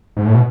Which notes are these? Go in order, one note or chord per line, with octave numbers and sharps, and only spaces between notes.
G#2
A2
B2